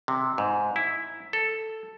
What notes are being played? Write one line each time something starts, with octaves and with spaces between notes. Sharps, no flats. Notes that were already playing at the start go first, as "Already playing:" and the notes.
C3
G#2
E4
A4